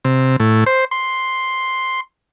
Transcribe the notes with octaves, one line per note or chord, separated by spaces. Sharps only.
C3
A2
C5
C6